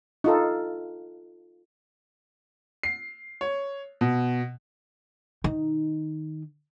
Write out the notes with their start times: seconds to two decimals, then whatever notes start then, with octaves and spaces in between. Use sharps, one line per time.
0.24 D#4 F4 A4
2.83 C7
3.41 C#5
4.01 B2
5.44 D#3 D#4